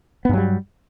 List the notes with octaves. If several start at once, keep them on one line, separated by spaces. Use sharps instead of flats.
G2 F#3 G3 B3